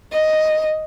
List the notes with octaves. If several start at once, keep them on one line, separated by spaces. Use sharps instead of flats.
D#5